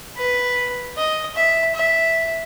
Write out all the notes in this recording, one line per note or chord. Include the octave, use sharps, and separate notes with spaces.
B4
D#5
E5
E5